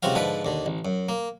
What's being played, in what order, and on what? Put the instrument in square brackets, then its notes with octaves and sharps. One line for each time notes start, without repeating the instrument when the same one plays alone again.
[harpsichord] C#2 C3 C4 F#4 F5
G#2 D3 F3 B4
D#2 D3
A1
F#2
A#3